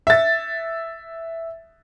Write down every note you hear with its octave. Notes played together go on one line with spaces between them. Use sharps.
E5 A6